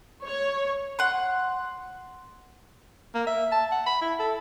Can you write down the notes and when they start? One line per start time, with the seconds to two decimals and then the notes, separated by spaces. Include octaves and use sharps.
0.24 C#5
0.99 F#5 C6
3.15 A#3
3.27 E5
3.52 A5
3.72 F#5
3.87 B5
4.02 E4
4.20 A4